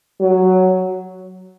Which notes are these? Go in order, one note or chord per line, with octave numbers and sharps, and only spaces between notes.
F#3